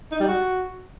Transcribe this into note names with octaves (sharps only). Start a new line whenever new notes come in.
D#4
G3
F#4